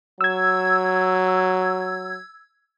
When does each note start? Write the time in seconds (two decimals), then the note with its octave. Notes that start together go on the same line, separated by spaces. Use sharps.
0.21 F#3 E6 G#6